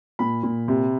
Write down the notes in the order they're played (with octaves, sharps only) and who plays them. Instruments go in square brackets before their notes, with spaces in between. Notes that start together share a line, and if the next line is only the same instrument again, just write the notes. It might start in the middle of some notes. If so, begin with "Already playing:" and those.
[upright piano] A#2 B5
A#2
C3